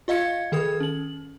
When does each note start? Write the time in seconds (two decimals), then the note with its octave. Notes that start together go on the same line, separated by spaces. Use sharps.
0.08 F4 D#5 F5 G#6 C#7
0.52 D#3 G#4 A4 D#6 G#6
0.80 C#4 F#7